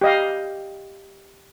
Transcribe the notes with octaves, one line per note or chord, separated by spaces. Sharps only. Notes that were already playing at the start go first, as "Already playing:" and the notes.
G4 D#5 F5